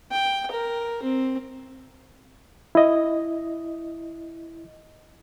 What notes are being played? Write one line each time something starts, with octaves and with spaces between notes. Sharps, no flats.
G5
A#4
C4
E4 D#5